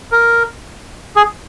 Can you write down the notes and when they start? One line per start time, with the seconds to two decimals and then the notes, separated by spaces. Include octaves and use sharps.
0.12 A#4
1.16 G#4